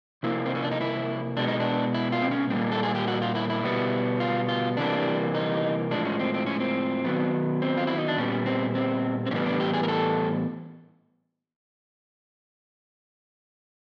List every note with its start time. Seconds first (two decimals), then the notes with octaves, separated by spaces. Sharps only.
0.23 C3 F3 A#3 E4
0.46 C4
0.55 C#4
0.64 D4
0.71 D#4
0.81 E4
1.37 B2 G#3 B3 D4
1.48 D#4
1.60 D4
1.94 E4
2.12 F4
2.22 C4
2.31 C#4
2.50 A#2 G3 A#3 C4
2.72 A4
2.83 G#4
2.95 G4
3.08 F#4
3.22 F4
3.35 E4
3.50 E4
3.63 B2 G3 B3
4.20 F4
4.49 F4
4.77 C3 E3 G3 A#3 D4
5.35 D#4
5.91 A2 F3 G#3 D4
6.05 C#4
6.19 C4
6.34 C4
6.46 C#4
6.60 C4
7.05 D#3 F#3 B3
7.62 C4
7.77 F4
7.87 E4
7.98 D#4
8.08 D4
8.18 A#2 G3 B3 C#4
8.46 C4
8.75 C4
9.26 C4
9.31 A2 E3 G3 B3 C#4
9.46 D4
9.60 G4
9.74 G#4
9.83 A#4
9.88 A4